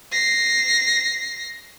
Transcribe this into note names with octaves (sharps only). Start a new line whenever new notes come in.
A#6 C7